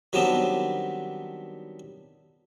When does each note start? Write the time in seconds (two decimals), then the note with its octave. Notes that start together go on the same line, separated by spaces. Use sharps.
0.13 D#3 F#3 G3 B3 C4 D4